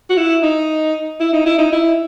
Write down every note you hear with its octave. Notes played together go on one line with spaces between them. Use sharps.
F#4
E4
D#4
E4
D#4
E4
D#4
E4